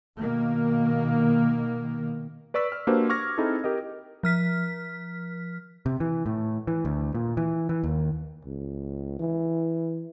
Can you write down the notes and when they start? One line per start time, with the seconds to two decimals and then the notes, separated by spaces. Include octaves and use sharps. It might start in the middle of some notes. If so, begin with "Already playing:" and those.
0.19 B2 D#3 A#3
2.54 B4 D5 C#6 E6 B6
2.72 F6
2.87 A#3 D4 F#4 G4 B4 C5
3.09 C#6 D6 F6 G#6 A#6
3.38 C4 D#4 E4 G#4 A4
3.64 G4 A#4 D#5
4.23 F3 F6 B6
5.86 C3
6.00 E3
6.26 A2
6.67 E3
6.85 D2
7.15 A#2
7.37 E3
7.69 E3
7.83 D#2
8.45 C#2
9.19 E3